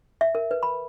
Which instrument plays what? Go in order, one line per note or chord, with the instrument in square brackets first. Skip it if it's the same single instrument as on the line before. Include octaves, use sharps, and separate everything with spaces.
[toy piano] E5
A#4
B4
B5